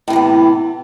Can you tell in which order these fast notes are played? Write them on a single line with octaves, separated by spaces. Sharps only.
A2 C3 E3 B3